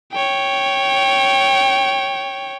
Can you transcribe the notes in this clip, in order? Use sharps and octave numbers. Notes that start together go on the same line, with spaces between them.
C#5 G5